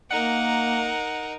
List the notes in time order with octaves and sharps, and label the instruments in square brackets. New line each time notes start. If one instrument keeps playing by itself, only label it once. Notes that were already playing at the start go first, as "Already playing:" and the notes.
[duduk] A#3 [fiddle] D#4 A#4 [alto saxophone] F#5